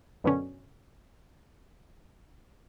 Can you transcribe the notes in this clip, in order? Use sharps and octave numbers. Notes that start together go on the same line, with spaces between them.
F#2 B2 D3 C#4